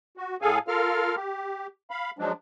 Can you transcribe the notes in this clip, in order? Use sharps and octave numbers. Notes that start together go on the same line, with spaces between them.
F#4
A2 G#4 A4 F5 G#5
F4 A4 A#4 F5 F6
G4
F5 B5
F3 F#3 G#3 D4